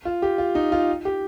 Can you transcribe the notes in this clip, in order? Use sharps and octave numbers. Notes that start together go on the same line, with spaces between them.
F4
G4
F4
D#4
F4
G4